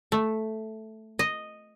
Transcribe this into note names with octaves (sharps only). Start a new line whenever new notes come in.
A3
D#5